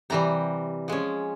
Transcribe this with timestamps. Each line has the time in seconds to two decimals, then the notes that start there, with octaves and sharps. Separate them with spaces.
0.10 C3 E3 G3 A#5
0.88 F3 G#3 C#4